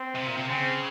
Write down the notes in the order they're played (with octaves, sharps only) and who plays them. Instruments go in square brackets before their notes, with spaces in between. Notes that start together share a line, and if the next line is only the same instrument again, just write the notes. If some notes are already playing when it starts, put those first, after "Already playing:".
Already playing: [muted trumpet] C4
[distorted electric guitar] C3
A#2
C3
[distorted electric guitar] C#3 [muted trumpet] C4